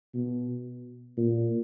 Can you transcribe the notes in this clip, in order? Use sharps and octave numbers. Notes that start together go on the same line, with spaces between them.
B2
A#2